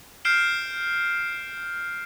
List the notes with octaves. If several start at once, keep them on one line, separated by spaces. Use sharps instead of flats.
F6 G6 C7 D7 E7 G7